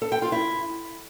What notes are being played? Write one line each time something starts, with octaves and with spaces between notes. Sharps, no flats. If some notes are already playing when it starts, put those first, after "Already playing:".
A4
G5
F4
E4